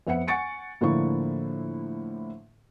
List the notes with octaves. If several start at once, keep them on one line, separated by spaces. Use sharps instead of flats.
F2 B3 E5 F#5 C#7
F#5 G#5 C#6 A6 C#7 D7
A2 D3 F3 A#3 E4 C#6